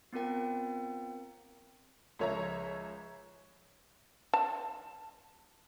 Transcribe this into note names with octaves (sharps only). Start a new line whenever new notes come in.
B3 C4 F4 A#4 G5
C#2 F3 C#5 E5 A#5
A5